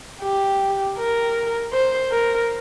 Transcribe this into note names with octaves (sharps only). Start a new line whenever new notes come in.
G4
A#4
C5
A#4